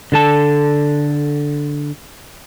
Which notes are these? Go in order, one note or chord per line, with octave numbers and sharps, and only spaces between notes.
D3 A4 A5